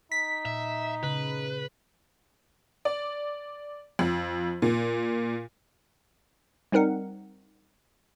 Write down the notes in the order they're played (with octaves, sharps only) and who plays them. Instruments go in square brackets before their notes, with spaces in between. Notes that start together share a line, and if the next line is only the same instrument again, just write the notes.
[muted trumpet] D#4 [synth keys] B6
[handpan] A#2 [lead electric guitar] E5
[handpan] C#3 [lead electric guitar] B4
[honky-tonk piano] D5
F2
A#2
[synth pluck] G3 C4 D#4 A#4 F#5